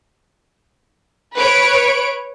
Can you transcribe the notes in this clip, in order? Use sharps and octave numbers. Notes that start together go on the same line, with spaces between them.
B4 C#5 D7